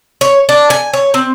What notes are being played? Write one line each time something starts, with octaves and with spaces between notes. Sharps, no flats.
C#5
D4
G#5
C#5
C4